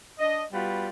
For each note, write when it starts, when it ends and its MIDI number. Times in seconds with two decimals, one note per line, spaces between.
0.19 0.43 62
0.19 0.43 75
0.52 0.88 55
0.52 0.88 59
0.52 0.88 65
0.52 0.88 66
0.52 0.88 71